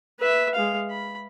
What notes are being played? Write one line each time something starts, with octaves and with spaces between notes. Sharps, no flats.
B4 E5
G#3 F5
B5